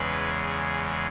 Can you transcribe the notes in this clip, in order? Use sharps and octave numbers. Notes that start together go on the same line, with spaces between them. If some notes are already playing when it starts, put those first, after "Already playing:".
Already playing: E2 C#3 G#3 B4